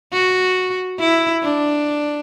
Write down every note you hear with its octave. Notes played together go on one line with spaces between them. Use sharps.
F#4
E4
D4